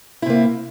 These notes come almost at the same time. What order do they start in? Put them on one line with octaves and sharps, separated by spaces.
E4 C3 A#3